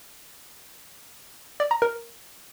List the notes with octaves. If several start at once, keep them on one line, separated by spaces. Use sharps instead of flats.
D5
A#5
A#4